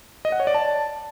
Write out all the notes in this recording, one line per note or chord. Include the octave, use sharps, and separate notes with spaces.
D#5
F#5
C#5
D5
A5